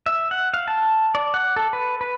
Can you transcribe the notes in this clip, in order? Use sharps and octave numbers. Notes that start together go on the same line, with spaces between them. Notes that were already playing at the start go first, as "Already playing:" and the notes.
E5
F#5
F5
A5
D5
F#5
A4
B4
B4